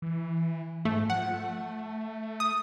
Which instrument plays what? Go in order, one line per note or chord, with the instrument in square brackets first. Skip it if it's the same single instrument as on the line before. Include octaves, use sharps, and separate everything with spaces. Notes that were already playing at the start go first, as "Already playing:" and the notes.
[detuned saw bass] E3
[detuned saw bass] G#2 [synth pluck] A3
[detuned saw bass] F3 [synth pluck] F#5
[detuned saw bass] A3
[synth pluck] D#6